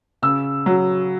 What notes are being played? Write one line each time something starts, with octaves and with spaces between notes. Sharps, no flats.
C#3 E6
F#3